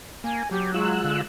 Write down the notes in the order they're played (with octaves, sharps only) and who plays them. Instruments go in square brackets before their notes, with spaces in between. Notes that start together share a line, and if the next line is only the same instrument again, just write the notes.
[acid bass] A#3 [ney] G#5
[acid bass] F#3 [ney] G4
[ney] G#3 [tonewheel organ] F4 E6 F#6
[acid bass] D3